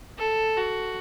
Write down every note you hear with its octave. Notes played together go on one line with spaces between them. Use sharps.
A4
F#4